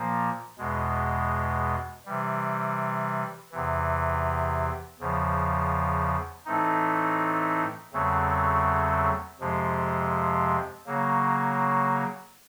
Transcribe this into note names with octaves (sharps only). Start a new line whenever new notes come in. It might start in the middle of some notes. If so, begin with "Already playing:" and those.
Already playing: A#2 F3 A#3
E2 B2 G#3
C3 E3 G3
E2 C3 E3
E2 C#3 F3
A2 E3 A3 C4 D#4
E2 C#3 F#3 A3 C4
F2 C3 F3 G#3
C#3 F#3 A#3